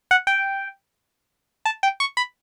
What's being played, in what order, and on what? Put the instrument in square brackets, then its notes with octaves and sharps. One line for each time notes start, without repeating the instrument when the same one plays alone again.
[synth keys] F#5
G5
A5
G5
C#6
B5